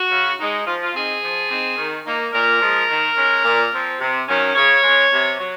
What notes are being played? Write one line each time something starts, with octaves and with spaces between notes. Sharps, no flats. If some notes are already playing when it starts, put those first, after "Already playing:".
Already playing: F#4
C#3
G#3 D#4
F3 F4
F4
C4 D#4 G#4
F3
C4 D#4
D#3
A#3 D#4
A#2 A#4
F3 G#3
D#3
G#3 C#4
A#2
F3 C4
C3
D#3 F#3 C#4
C#3 C#5
G#3 C#4
C3
F#3